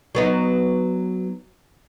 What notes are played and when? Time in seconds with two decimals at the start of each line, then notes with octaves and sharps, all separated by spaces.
0.15 F#3 B3 D#4